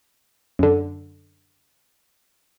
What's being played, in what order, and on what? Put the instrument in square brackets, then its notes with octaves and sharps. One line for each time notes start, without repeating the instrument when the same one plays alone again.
[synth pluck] F#2 D3